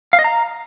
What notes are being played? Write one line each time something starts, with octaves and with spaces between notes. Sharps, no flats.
F5
D#5
A#5